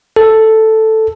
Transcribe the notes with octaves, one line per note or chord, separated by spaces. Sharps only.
A4